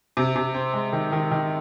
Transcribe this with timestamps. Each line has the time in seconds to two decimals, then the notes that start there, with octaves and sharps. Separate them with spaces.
0.17 C3
0.36 C3
0.54 C4
0.73 G#3
0.93 D#3
1.12 D#3
1.31 D#3